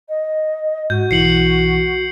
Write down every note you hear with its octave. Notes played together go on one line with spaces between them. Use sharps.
D#5
G#2 F#4 G6
B1 E3 C7 C#7 F#7